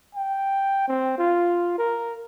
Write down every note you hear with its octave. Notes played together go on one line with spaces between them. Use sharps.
G5
C4
F4
A#4